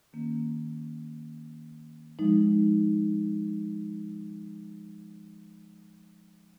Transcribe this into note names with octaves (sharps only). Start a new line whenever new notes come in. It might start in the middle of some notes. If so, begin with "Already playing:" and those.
D#3 A#3 C#4
F3 G#3 D#4